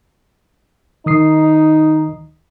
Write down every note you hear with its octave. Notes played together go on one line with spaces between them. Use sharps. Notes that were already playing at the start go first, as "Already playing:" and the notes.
D#3 D#4 D#6 C7